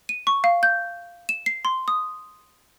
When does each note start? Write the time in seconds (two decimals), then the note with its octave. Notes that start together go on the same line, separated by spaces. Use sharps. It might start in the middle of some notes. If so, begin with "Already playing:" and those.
0.09 D#7
0.27 C#6
0.44 F5
0.63 G6
1.29 E7
1.46 C7
1.65 C6
1.88 D#6